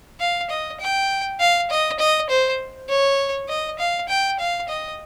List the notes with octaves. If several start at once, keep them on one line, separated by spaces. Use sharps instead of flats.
F5
D#5
G5
F5
D#5
D#5
C5
C#5
D#5
F5
G5
F5
D#5